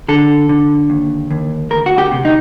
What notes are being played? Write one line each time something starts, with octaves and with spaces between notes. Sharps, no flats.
D3 A4
D3
D#2
D#2
D2 A#4
F#4
G4
C3
D#4